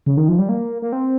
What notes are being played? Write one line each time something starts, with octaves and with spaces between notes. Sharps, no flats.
C#3
D#3
F3
G3
A#3
A#3
C4